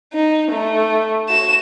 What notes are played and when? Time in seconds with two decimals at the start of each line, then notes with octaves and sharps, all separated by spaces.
0.13 D#4
0.52 A3
1.29 F#4 E7